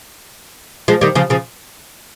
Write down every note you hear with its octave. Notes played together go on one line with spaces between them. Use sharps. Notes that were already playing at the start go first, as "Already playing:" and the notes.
F3 G#3
D#3 G3
C#3 F3
C#3 F3